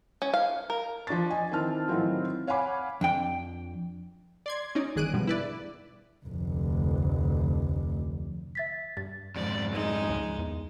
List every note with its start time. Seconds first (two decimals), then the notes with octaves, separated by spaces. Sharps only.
0.22 C#4
0.34 F5
0.70 A#4
1.07 F3 D4 C#6 A6
1.30 D#5 G#5
1.52 D#3 E3 C4 A5 F6
1.88 A2 D#3 E3 F#3 C4 F4
2.47 C#5 F5 F#5 G#5 B5 D6
3.01 F2 D4 G5
4.46 D5 C6 G#6
4.75 C#4 D#4 D5
4.96 G1 D#3 G#4 F#6 D7 D#7
5.13 G2 B2 F3 G3 B3
5.27 E4 B4 D5
6.26 F1 D2
8.55 E5 A6 B6
8.97 G2 A6
9.36 F2 G#2 D5
9.72 G#3 D#4
10.09 C#2
10.39 E2